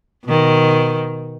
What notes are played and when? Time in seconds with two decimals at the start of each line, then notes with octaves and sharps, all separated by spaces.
0.25 B2 D#3